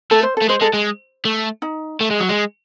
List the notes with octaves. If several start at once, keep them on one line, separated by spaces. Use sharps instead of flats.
A3 A4
C5
A4
A3
G#3 C5
G#3 A4
G#3
A3
D#4
A3
G#3
F#3
G#3